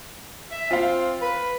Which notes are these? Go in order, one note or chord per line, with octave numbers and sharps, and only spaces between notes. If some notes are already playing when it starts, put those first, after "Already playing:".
E5
C4 F4 F5
B4